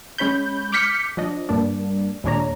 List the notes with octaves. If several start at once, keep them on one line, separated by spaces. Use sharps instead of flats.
G#3 C#4 C#5 B5 G6
D6 F6 G6 B6 C#7
F3 D4 D#5
G2 A#3 D4
D#2 A#2 G#3 D4 C#5 A#5